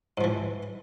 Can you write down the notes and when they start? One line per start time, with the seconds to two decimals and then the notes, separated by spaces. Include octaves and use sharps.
0.18 G#2
0.21 F3
0.24 E3